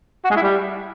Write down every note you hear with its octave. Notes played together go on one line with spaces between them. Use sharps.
F#4
G#3
E4
G3